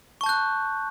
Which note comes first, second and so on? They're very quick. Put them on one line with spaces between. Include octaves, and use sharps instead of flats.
C#6 A5 G6 F#6